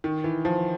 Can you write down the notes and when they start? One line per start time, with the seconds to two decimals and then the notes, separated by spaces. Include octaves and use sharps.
0.04 D#3
0.24 E3
0.45 F3